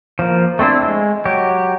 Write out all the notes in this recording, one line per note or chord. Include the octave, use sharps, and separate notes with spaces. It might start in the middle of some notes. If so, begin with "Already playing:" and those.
F3 A#3
A3 C4 D4 E4
G#3
F#3 G4